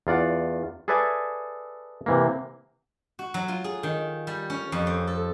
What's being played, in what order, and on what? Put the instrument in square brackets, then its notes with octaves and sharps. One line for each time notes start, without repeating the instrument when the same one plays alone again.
[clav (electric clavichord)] E2 F4 D5 F#5
G#4 A4 B4 D5 E5 G#5
C3 E3 A#3
[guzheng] F#4
F#3
F4
G#4
D#3
G3
C#4
F2
C4
A4